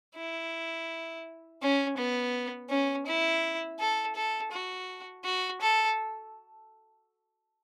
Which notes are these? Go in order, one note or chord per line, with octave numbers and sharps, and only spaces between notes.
E4
C#4
B3
C#4
E4
A4
A4
F#4
F#4
A4